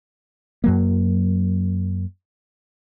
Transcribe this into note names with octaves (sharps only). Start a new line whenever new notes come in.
F#2 F#3 A#3